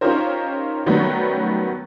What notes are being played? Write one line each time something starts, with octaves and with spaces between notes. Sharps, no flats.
C#4 D#4 F4 G4 A#4 C5
D#3 F#3 G3 A3 B3 C#4